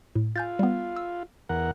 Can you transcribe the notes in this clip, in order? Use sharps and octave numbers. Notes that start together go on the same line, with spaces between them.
A2
F4 G#5 G6 A6
G3 B3
E6
E2 A#4 F#5